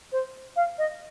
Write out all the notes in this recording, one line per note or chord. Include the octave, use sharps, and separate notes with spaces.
C5
F5
D#5